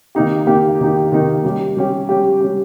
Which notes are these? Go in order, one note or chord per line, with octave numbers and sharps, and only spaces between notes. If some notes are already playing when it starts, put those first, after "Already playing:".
D#3 A#3 D#4 G4
D#3 A#3 D#4 G4
D#3 A#3 D#4 G4
D#3 A#3 D#4 G4
G3 C#4 G4
G3 C#4 G4
G3 C#4 G4
G3 C#4 G4